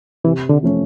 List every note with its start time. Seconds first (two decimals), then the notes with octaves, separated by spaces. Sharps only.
0.24 C3 E3
0.49 D3
0.63 F3 A3 C#4